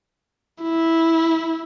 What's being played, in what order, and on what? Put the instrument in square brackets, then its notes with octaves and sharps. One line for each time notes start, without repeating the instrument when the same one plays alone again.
[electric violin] E4